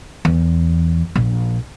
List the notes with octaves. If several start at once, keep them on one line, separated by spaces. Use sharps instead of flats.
E2
A#1